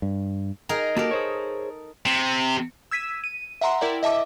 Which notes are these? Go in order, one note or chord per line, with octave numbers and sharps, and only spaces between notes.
G2
D#4 G#4 A#4
A#3 F#4 G4 A4 A#4
G#4 C5 C#5
C3
E6 G#6 B6 D#7 E7
D#7
E5 F#5 A#5 C6
E4 A#4 D5 G5
D#5 E5 A5 D6